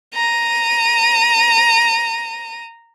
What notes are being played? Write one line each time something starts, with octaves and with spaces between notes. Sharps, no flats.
A#5 D#7